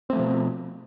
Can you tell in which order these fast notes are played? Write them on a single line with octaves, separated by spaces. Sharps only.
C4 A3 F3 B2